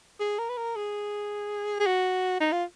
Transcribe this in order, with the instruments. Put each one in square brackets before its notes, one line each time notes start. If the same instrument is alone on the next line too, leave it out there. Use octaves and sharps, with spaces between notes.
[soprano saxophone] G#4
A#4
B4
A#4
G#4
G#4
F#4
D#4
F4